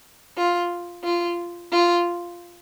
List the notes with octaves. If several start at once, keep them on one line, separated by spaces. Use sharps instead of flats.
F4
F4
F4